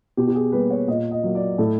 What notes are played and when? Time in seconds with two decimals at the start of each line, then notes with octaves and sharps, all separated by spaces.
0.17 B2 G4
0.27 G4
0.35 G#4
0.52 G3 A#3 B4
0.70 C#5
0.88 A#2 D#5
1.11 D#5
1.23 F#3 A#3
1.35 D5
1.58 A2 A4